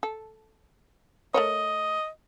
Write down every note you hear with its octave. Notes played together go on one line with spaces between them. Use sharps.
A4
A3 A#4 C#5 D#5